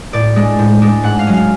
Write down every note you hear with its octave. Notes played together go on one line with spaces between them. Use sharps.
A2 D5
G#3 D4
A2
G#3 D4
G#2 F#5
F5
F#3 C#4
F5